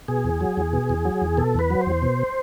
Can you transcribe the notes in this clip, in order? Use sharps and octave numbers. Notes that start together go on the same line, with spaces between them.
B2 G#4
E2
F#3
E2
B2
E2
F#3
E2
B2 A4
E2 B4
F#3
C5
E2
B2